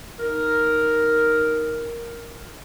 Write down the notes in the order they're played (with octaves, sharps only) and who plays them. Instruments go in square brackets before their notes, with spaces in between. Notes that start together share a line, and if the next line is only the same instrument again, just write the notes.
[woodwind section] D#4 A#4